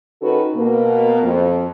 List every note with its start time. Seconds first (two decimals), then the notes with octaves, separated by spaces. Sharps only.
0.22 D#3 C#4 D#4 F#4 A4 B4
0.55 B2 A#3
1.23 F2